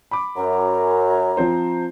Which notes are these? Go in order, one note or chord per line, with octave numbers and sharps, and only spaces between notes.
B5 D6
F#2 A#5
F3 C4 C5